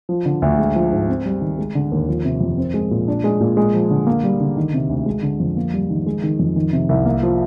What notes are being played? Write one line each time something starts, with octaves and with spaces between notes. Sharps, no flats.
F3
D3
D2
G#3
F3
G#2
C4
G3
D#3
G#3
D3
D#2
F3
C3
F2
C4
G#3
A#2
D4
G#3
A#2
G#3
F3
D3
A#3
G3
D3
D#3
C3
D2
G#3
D3
F2
A#3
G3
D#3
G#3
D#3
F2
D#3
C3
C2
A#3
F3